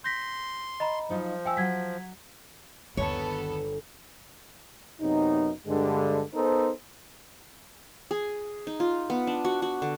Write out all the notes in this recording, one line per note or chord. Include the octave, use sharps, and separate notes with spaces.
C6 G6 A#6 B6
D#5 A#5 B5
F3 F#3 D#4 F4
E5 G5 G#5 E6
F#3 F#5 G#6 B6
G1 D#2 D#3 B3 A4 C#5
F#2 C3 B3 C#4 D#4
G2 D3 G#3
B3 D#4 A4 A#4 C5
G#4
D#4
F4
B3
D4
F#4
F#4
D3